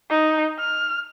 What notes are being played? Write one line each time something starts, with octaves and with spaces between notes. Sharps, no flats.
D#4
F6